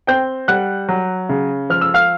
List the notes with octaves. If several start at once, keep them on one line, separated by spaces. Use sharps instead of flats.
C4 G5 G6
G3 F#5 F#6
F#3
C#3
F3 F6
E6
F5 F6